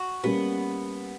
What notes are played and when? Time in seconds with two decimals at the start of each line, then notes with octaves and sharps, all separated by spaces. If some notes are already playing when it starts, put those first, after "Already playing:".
Already playing: F#4
0.23 G3 A#3 B3 C#4 G4